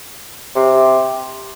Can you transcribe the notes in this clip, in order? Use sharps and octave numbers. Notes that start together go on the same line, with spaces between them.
C3